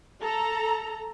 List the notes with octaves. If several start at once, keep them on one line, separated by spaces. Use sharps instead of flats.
A4 A#5